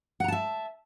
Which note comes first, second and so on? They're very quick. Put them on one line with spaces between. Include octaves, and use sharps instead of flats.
F#5 A#5 A5 E5